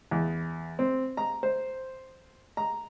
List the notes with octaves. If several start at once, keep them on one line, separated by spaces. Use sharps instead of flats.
E2
C4
A#5
C5
A#5